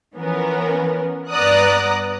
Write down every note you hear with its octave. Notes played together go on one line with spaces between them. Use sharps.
E3 F3 B3 C#4 A#4
G2 B3 D5 A#5 D#6 F#6